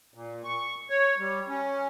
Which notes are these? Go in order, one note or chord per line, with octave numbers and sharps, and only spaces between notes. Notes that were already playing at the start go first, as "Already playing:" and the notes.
A#2
C#6
C#5
G3
C#4